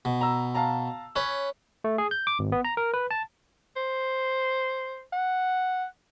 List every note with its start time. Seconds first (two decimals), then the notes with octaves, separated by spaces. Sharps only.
0.05 B2
0.21 A#5 E6
0.54 F5 A5 A#5
1.16 C#4 B4 C#5
1.84 A3
1.98 G#4
2.11 G6
2.27 D6
2.39 G#1
2.52 B3
2.65 A#5
2.77 A#4
2.94 B4
3.11 A5
3.76 C5
5.13 F#5